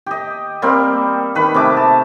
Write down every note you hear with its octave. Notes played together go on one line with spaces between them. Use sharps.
G4 D#5
G3 A#3 C4
D#3 B4 B5
C3 A3 G#4 D6
A5